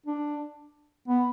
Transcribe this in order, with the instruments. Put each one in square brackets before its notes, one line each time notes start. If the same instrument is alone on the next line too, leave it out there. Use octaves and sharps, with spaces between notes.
[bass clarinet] D4
B3